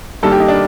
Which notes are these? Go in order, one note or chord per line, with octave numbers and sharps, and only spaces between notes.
G2 D#3 G3 A#3 A4
G4
D#4
D4